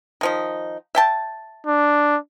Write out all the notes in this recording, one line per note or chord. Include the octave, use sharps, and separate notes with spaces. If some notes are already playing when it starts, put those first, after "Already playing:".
D#3 F3 D#4
E5 G5 A5
D4